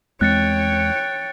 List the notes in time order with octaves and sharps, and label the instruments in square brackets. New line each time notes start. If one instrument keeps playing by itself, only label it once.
[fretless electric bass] E2 G#3 C4 [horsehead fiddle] C#5 G5 [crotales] F#6 A6 C#7